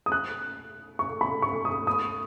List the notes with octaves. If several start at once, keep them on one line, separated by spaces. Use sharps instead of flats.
D#6
F#6
C#6
B5
C#6
D#6
D#6